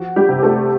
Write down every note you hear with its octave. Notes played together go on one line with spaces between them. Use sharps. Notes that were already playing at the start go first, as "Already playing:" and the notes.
Already playing: F3 F#4
G3 G4
C3
A3 A4